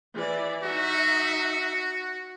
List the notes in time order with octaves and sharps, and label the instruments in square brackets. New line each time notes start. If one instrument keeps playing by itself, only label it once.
[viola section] E3 D5
[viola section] D#4 E5 [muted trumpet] F#4